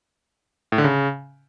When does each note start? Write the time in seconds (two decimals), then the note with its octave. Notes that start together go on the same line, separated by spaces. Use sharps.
0.72 A2
0.78 D3
0.84 C#3